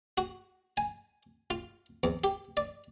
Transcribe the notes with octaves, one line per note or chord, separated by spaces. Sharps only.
F#4
G#5
F4
E2
G4
D5